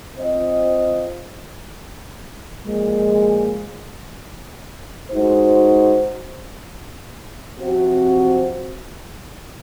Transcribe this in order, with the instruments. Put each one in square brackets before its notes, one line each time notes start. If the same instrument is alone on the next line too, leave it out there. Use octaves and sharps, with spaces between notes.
[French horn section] C4 F4 C5 D#5
A#2 F3 G#3
G#3 D#4 F#4 C5
C3 F3 C4 F#4 C5